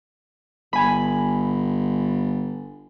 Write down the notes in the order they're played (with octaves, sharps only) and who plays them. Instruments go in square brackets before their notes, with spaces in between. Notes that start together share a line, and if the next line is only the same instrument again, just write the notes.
[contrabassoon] G1 [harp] G#5 B5